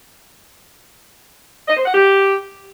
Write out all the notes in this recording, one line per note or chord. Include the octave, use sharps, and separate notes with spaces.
D#5
C5
F#5
G4